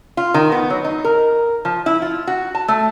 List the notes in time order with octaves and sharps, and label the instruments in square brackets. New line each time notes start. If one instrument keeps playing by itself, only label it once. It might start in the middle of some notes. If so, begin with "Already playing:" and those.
[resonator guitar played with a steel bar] F4
D#3
B3
F#3
D#4
A#4
F3
E4
F4
F#4
A5
A3